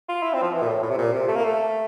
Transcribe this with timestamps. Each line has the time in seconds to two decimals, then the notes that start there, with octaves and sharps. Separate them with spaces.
0.09 F4
0.23 E4
0.34 C4
0.42 F3
0.53 E3
0.62 A#2
0.68 A2
0.82 A2
0.90 C3
0.98 A#2
1.13 C3
1.28 A3
1.36 A#3
1.44 A3